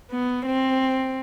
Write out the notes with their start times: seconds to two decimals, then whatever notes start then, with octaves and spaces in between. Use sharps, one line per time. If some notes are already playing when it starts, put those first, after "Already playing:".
0.11 B3
0.46 C4